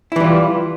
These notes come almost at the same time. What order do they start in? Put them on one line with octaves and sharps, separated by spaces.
E4 E3 G3 F4